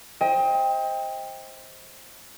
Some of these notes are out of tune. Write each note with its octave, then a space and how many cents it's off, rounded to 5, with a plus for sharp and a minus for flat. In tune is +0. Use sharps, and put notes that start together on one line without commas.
C5 +15 D#5 +35 G5 +20